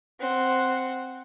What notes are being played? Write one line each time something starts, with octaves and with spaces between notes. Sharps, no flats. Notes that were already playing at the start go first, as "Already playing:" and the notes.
C4 F#5